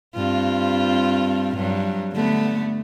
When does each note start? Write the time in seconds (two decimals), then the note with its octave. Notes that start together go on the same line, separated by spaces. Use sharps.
0.15 G2 C4 F4
1.57 G2 F#3
2.13 D3 A3 B3